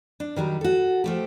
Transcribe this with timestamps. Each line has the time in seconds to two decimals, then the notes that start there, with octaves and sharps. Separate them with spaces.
0.20 D4
0.36 D#3 F#3 G3 D#4
0.61 F#4 A4
1.04 F3 A3 G4